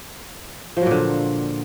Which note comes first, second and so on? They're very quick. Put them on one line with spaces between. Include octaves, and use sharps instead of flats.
F3 F#3 A#2 D3